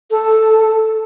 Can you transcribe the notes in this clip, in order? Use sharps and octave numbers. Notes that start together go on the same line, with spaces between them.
A4